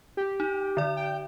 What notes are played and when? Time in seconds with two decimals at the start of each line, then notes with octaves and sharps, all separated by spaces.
0.17 G4
0.40 D#4
0.77 D3 D5
0.97 G5